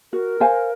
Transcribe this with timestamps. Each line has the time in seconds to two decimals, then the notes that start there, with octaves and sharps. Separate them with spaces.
0.13 F#4 A#4
0.40 C5 F5 G#5